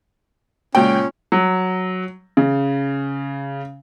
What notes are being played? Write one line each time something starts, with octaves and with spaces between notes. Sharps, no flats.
C#2 A#2 C#4 G5
F#3
C#3